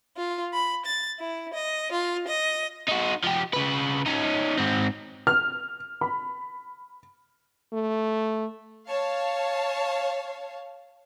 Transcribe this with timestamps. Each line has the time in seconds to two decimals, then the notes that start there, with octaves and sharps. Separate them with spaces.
0.16 F4
0.53 B5
0.85 A6
1.19 E4
1.53 D#5
1.92 F4
2.27 D#5
2.89 D#4 F#4
3.24 F3 G4
3.53 C#3 B4
4.06 C#4 D#4
4.58 G#2 C4
5.27 F6
6.01 B5
7.73 A3
8.87 C#5 F5 A5